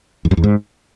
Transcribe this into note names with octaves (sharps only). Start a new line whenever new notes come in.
E2
F#2
E2
G#2